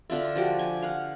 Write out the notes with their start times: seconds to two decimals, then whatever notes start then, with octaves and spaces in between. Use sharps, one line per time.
0.10 D3 D4 F4 E5
0.36 F3 F#4 G4
0.59 G#5
0.83 F5 F#5